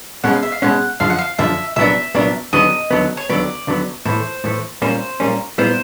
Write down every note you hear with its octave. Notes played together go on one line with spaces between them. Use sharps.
B2 G#3 C#4 F#5
F5
E5
F5
B2 G#3 C#4 F#5
F#2 D3 F3 F5
F#5
F5
F#2 D3 F3 E5
C2 A#2 F#3 B3 D4 E5
C2 A#2 F#3 B3 D4
D#2 D3 F#3 B3 D#5
D#2 D3 F#3 B3
C#5
D#2 D3 F#3 B3 D5
D#2 D3 F#3 B3
A2 E3 A3 C5
A2 E3 A3
A#2 G3 A#3 C#4 C5
A#2 G3 A#3 C#4
A#2 G3 B3 E4 C5